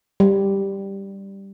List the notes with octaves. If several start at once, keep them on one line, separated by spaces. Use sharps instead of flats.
G3